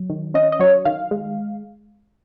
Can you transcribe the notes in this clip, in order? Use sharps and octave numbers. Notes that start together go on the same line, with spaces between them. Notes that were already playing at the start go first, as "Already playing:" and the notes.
Already playing: F#3
D#3
C#4 D#5
D#5
F#3 C#5
D#3 F5
G#3